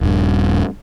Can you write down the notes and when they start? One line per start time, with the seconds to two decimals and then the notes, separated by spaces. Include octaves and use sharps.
0.01 D#1 G2